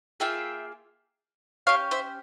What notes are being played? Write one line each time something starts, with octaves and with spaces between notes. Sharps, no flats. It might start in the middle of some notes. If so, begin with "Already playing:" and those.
A#3 F4 G#4 E5 G5
C#4 G4 C#5 F5
C5 E5